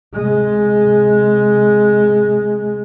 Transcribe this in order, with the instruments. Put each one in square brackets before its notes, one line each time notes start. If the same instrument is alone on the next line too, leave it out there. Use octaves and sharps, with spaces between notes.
[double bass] C3 G#3